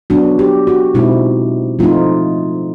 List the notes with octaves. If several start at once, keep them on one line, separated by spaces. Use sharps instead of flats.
F#3 B3 D4 F#4
G4
F#4
B2 G#3 C4 D#4 E4
F3 A3 C4 D#4 F4